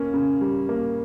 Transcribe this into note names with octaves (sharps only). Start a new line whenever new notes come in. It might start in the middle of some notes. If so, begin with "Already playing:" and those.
Already playing: A#3 C#4
C#3
G3
A#3